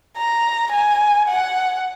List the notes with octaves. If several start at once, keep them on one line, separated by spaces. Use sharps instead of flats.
A#5
G#5
F#5